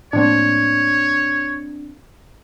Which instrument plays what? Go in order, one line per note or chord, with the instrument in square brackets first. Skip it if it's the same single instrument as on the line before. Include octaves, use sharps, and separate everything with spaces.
[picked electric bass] A2 F3 A#3 [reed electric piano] C4 D4 [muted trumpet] C#5